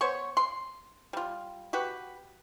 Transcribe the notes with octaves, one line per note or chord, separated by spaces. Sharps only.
B3 C5 C#5 C#6
C6
G3 F4
F#4 G4 B4